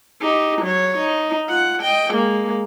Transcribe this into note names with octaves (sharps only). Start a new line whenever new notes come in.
D#4 G4
F#3 C#5
D#4
F4 F#5
D#5 G5
G#3 A#3